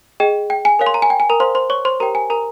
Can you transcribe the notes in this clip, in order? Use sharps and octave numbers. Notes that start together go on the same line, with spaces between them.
G#4 D#5 G5
G5
G#5
A#4 C#5 F5
C6
A#5
G#5
G5
G#5
A#4 A#5
A#4 C5 F5 C6
C5 C6
C#5 C#6
C5 C6
G4 A#4 C#5 G5 A#5
G#5
A#4 A#5